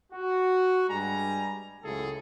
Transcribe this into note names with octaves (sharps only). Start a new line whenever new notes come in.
F#4
G2 G3 G#3 G#5 A#5
C#2 F#2 A2 C#3 G#4 A4